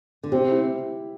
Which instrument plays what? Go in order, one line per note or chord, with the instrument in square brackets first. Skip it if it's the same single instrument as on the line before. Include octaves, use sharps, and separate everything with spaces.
[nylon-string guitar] D3
[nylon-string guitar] C3 [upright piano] G4
[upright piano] E4